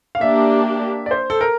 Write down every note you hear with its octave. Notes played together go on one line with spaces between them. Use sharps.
F5
A#3 D4 G4 E5
D5
C5
A4
A#4